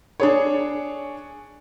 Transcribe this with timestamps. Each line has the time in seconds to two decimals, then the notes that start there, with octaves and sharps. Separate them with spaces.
0.20 D4 G#4 C#5